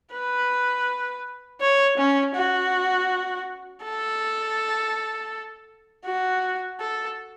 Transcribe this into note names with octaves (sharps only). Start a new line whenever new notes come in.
B4
C#5
C#4
F#4
A4
F#4
A4